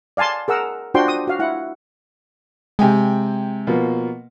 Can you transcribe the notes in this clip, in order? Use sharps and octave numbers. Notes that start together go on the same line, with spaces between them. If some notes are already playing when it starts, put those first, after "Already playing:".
D5 F5 G#5 A5 C6
G#4 A#4 F#5 E6
D4 F4 F#4 C5 G5 C6
D#6
F#4 F5
E4 F#5
C3 G#3 G5 G#5
B2 F3 A#3